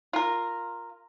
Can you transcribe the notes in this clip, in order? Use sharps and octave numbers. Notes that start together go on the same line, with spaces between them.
F4 A#4